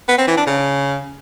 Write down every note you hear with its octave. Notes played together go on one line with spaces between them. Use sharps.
B3
C4
E3
D4
C#3